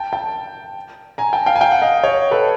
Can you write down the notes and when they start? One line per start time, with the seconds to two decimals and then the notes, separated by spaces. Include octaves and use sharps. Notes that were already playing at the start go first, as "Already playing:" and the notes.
Already playing: G5 A5
0.13 G5 A5
1.18 G#5 A#5
1.33 G5 A5
1.46 F5 G5
1.56 G#5
1.61 F5 G5
1.72 F#5
1.82 D#5 F5
2.03 C#5 D#5
2.31 A4 B4